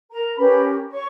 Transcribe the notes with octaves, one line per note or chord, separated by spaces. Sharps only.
A#4 A#5
C#4 G4 A#4 B4 B5
C#5 C#6